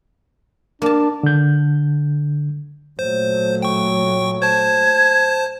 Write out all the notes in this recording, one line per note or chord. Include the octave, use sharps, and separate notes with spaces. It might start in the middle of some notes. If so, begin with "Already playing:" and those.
A#3 D4 A5
D3 G6
A#2 F#3 A3 C5
G5 C#6
C5 A5 G#6